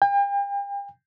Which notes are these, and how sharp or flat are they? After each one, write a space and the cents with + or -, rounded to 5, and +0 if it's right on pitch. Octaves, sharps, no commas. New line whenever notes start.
G5 +40